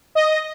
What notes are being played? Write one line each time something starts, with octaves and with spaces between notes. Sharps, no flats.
D#5